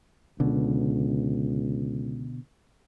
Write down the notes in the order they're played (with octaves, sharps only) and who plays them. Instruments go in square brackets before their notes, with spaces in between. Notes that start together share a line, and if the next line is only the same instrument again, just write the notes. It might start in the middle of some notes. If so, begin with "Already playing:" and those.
[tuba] C#2 [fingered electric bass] B2 D3